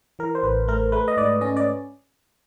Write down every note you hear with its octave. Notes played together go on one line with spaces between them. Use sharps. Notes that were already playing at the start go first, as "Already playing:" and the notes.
E3 A#4
C5
A1 B4
A3 A#4
A3 B4
D#5
G#2 D5
C#4 D#5
D5